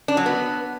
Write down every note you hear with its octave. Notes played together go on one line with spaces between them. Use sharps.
D4
F#3
B3